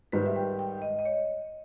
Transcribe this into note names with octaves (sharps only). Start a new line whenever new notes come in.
G#2 D#3 G3 B4
E5
G5
G5
D#5
D#5
C#5